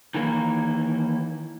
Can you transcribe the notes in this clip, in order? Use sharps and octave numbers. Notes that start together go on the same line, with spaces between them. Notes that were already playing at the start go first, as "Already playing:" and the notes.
D#3 E3 A#3